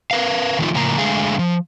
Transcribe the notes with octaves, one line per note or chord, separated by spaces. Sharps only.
A#4 B4 F5
D#3 F3 A3 C#4 D#4 F4
A2 C#3 F3 A#3 A#5
D3 G#3 A3 G#4 F5
F3